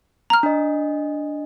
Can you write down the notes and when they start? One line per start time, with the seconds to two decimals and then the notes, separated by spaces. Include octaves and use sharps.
0.30 A#5 F6
0.43 D4 D#5